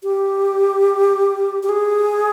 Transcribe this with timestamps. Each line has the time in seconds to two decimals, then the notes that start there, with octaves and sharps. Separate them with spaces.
0.03 G4
1.63 G4
1.69 G#4